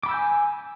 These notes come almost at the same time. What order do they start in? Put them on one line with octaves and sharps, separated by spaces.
D6 B5 E6 G6 G#5